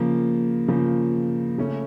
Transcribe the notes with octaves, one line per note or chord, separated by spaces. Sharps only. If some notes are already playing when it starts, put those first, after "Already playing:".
Already playing: C#3 F3 A#3
C#3 F3 A#3
C#3 A3 C#4